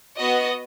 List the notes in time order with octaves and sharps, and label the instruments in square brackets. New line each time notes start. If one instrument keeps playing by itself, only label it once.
[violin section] B3 F#4 D#5